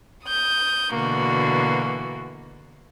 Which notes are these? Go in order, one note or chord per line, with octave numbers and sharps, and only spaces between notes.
D#6 G6
B2 D3 E3 A#3 F#4